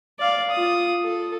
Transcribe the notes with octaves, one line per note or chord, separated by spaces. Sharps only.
D5 F5
F4 D#6
A4